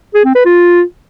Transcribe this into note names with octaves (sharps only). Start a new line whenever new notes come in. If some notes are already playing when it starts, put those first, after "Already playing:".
G#4
C4
B4
F4